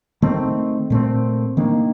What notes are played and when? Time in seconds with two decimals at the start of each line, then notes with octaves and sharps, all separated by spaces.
0.22 D#3 A3 C4
0.90 A#2 A3 C4
1.57 D#3 A#3 D4